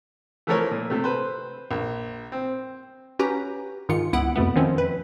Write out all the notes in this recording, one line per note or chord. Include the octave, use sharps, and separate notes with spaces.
E3 F3 A3 A4 A#4 C#5
A#2
C3 A3
B4 C5
A#1
C4
C#4 F#4 G4 B4 A#5
G#2 D#3 F4 C#7
C#2 B3 E4 F#5 D7
F2 B2 A3 B3
D#3 F3 C4 C#4
B4